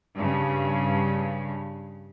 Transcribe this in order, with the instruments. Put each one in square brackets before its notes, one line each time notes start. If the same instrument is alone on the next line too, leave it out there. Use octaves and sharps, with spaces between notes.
[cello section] G2 C#3